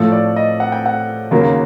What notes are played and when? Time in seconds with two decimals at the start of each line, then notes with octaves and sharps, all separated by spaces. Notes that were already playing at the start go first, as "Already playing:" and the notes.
Already playing: A2 F3 A3 A4
0.12 D5
0.36 D#5
0.60 F#5
0.72 G5
0.86 F#5
1.31 D#2 C#3 F#3 A#3